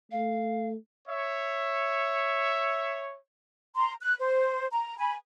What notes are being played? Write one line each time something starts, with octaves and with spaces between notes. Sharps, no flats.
A3 F5
C#5 E5
A#5 C6
F#6
C5
A#5
G#5 B5